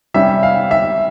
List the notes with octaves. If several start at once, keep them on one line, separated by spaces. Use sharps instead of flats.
C3 G3 C#4 E5
F5
E5